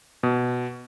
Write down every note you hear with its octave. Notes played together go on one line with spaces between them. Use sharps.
B2